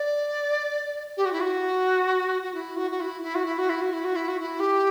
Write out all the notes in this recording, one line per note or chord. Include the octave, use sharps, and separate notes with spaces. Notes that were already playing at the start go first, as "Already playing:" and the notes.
Already playing: D5
G4
F#4
E4
F#4
F#4
E4
F#4
F#4
E4
E4
F#4
E4
F#4
E4
F#4
E4
F#4
E4
F#4
E4
G4